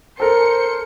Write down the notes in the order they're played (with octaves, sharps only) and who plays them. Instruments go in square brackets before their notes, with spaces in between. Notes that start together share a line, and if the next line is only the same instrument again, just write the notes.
[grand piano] A4 A#4 [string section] C5 C#7